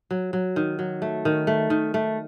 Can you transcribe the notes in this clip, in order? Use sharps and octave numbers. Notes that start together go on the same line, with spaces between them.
F#3
F#3
D#3
F#3
A3
D#3
A3
D#3
A3